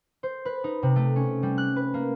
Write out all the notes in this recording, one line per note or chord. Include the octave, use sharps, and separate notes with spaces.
C5
B4
D#4
C3
A3
C#4
G3
F#6
B4
A#3